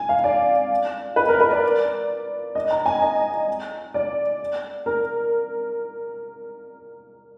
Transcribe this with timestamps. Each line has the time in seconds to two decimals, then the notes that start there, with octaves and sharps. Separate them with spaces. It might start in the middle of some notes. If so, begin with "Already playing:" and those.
Already playing: G#5
0.09 F5
0.24 D5
1.16 B4
1.28 A#4
1.41 B4
1.51 D5
2.55 D#5
2.71 A#5
2.86 G#5
3.02 D#5
3.94 D5
4.86 A#4